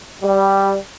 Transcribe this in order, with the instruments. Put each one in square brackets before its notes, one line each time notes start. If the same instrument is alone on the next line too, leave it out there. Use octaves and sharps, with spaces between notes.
[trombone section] G3